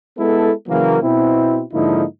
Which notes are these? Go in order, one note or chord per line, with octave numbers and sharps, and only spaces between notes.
G#3 B3 E4 A4
C#3 E3 F#3 A#3
B2 C4 E4
G#2 D3 F3 A#3 D#4 E4